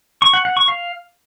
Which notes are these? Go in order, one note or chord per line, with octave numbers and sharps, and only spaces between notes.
C#6
F#5
F#5
C#6
F5